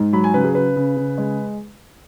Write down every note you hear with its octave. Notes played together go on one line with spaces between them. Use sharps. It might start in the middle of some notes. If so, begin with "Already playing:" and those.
Already playing: G#2
F#3 B5
G#5
C#3 B4
G#4
C#3 B4
C#3
C#3
G#3